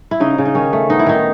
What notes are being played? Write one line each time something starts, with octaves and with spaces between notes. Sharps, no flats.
E4
C#3 D#4
C#3
D#4
D#3 C#4
A3
B3 D#4
E4
D#3 D#4